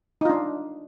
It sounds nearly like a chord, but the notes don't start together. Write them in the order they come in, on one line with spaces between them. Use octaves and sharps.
D#4 F4 D4